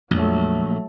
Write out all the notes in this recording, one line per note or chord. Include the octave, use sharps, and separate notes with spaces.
A#1 F2 F#3 G#3 A3